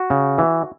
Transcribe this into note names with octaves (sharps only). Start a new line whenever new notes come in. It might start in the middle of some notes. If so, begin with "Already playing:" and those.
Already playing: F#4
C#3
E3